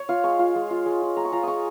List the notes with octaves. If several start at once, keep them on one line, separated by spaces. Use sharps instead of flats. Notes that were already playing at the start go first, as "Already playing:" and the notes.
Already playing: C#5
F4 F5
G#3 C#6
F4
G#3
F4
G#3
F4
G#3 A#5
C#6
F4 A#5
G#3 C#6 D#6